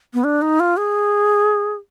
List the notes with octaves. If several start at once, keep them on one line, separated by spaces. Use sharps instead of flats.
B3
D4
D#4
F4
G#4